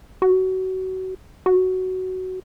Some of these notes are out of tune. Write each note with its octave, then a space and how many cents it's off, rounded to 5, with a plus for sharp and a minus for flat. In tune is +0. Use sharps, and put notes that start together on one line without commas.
F#4 +25
F#4 +10